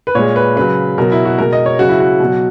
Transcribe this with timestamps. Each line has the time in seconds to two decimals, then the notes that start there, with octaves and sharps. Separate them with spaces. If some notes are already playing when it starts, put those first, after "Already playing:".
0.07 B4
0.15 A#2 G#3 C#5
0.36 B4
0.56 C#3 F#3 B4
0.98 B2 F#3 A#4
1.12 E4
1.25 F#4
1.38 B2 G#3 A#4
1.53 D#5
1.66 C#5
1.79 C#3 F#3 F#4
1.89 E4
2.00 F#4
2.20 B2 F#3